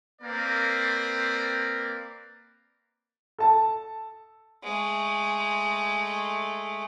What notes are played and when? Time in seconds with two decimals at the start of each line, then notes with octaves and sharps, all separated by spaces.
0.22 A#3 C4 A#4 B4 D5
3.39 A4 A5
4.64 G#3 A3